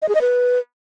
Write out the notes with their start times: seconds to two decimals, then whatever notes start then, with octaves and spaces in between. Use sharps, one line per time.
0.02 D#5
0.09 G#4
0.15 D#5
0.21 B4